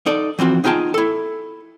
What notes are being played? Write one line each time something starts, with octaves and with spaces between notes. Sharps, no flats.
D#4 A4 D5
E3 F3 C4 F#4
B3 D#4 F4 G#4 G5 A5
E4 A4